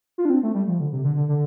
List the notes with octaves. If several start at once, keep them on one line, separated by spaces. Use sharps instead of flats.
F4
D4
C4
A3
G3
F3
D3
C3
D3
D3
D3